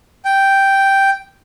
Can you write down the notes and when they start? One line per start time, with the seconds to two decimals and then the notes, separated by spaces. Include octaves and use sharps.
0.25 G5